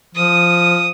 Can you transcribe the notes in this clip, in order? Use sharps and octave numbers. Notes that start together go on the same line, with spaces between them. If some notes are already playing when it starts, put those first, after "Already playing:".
F3 D#6